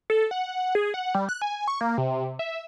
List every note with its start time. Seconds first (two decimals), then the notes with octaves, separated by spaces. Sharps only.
0.10 A4
0.31 F#5
0.75 G#4
0.94 F#5
1.15 G3
1.29 F#6
1.42 G#5
1.68 C#6
1.81 A#3
1.98 C3
2.39 E5